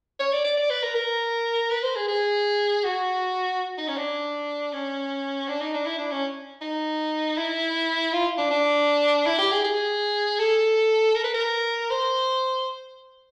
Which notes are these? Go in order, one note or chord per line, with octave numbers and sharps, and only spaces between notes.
C#5
D5
D5
D5
B4
A#4
A#4
B4
C5
G#4
G#4
F#4
D#4
C#4
D4
C#4
D4
D#4
D4
E4
D4
C#4
D#4
E4
F4
D4
D4
E4
G4
G#4
G#4
A4
A#4
B4
A#4
C5